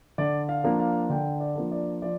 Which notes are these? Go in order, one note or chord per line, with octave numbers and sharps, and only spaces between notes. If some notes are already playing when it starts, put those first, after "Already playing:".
D3 D5
F5
F3 A#3 D4
F5
D3 G5
D5
F3 A#3 D4
D5
F3 D5